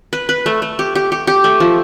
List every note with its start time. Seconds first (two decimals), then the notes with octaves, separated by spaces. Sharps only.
0.13 B4
0.29 B4
0.46 A3
0.62 A3
0.79 G4
0.95 G4
1.12 G4
1.27 G4
1.44 A3
1.60 F3